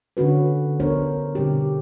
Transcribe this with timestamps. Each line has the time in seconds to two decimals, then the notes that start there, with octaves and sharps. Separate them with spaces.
0.17 D3 C#4 F#4 B4
0.80 B3 D4 A#4 C5 C#5
1.35 B2 D3 G3 C4 G4